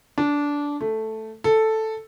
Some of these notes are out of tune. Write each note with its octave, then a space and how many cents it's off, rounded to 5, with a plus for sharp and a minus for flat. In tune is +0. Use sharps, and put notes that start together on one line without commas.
D4 -15
A3 +0
A4 +0